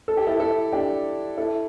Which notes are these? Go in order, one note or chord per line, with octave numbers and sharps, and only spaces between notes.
A4
G4
E4 A4
E4 A4
D4 G4
E4 A4